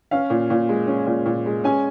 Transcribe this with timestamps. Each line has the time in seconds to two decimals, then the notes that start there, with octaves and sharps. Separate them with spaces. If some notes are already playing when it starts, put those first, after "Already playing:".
0.11 C#4 F5
0.30 A#2
0.50 A#2
0.69 G#3
0.87 C#4
1.07 A#2
1.26 A#2
1.46 G#3
1.64 C#4 G#5